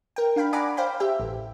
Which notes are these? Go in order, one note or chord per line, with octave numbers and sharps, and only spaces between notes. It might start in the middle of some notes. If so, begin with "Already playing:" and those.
A#4 G5
D4 F5 G5 B5
D5 F#5 G#5 A#5 B5 D6
C5 F5 G5 B5
G4 E5 G5
A1